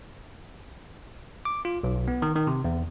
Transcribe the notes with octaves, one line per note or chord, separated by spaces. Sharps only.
D6
F4
B1
B3
D#3
D#3
C3
E2